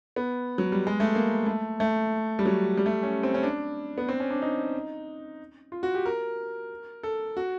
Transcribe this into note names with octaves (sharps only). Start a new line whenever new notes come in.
B3
F#3
G3
G#3
A3
A#3
A3
A3
G3
F#3
G3
A3
C#4
C4
C#4
D4
B3
C4
C#4
D4
D#4
F4
F#4
G4
A#4
A4
F#4